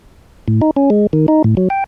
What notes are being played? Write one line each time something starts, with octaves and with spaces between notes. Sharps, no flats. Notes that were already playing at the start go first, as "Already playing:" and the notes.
A2
D#4
C#4
G#3
D#3
D#4
A2
F#3
G5